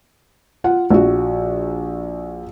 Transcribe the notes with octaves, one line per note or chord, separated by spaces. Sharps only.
F4 F#5
A#1 F#4